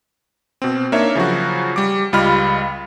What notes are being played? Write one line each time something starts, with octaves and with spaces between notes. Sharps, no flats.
B2 C4
A#3 D4 D#4 C#5 E5
C#3 F3 F#3 F#4
G3 D6
C#2 G3 F4 D#5 B5 F6